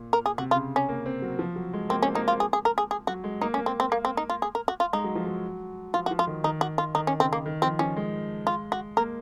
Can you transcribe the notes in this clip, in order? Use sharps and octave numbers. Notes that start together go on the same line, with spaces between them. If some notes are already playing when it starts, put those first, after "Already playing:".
Already playing: A#2
A#4
G#4
C3 F#4
F4
C#3
C#4
A#3
C4
F#3
F3
F#3
G#3
A#3 C4
C4 C#4
A#3 D#4
A#3 F4
G#4
G#4
A#4
G#4
G#4
F#3 F#4
G#3
A#3 D#4
C#4
A#3
C4
C4
A#3
C4
D#4
F4
G#4
A#4
F#4
F4
G#3 D#4
F#3
F3
F#3
F3 F4
F#4
F3
F4
D#3
D#3 D#4
F#4
F4
D#3 D#4
C#4
C#3 C4
A#3
D#3
F3 C4
F3 C#4
G#3
F4
F#4
A#3 A#4